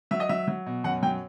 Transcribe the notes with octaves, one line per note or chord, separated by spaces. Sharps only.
F#3 E5
D#5
F#3 E5
F#3
B2
F#2 F#5
F#3 G5